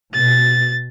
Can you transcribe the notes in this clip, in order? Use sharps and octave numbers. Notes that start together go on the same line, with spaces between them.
B2 A6